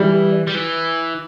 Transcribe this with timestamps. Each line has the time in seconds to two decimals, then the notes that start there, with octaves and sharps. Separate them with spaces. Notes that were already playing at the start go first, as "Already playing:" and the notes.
Already playing: E3 G3
0.47 G3
0.55 E3